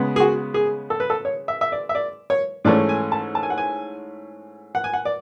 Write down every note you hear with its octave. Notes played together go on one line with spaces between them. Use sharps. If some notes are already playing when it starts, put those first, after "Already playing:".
Already playing: C#3 G#3 B3
G#4
F#4
G#4
A4
B4
A4
C#5
E5
E5
D5
E5
D5
C#5
G#2 E3 A3 C#4 D5
G#5
A5
A5
G#5
F#5
G#5
F#5
G#5
F#5
D5